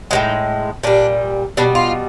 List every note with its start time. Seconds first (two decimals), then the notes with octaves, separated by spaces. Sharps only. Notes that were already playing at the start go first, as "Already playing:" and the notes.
0.11 A2 F3 G#3 D#4
0.83 A#2 G3 D4
1.57 B2 G3 D4
1.75 F4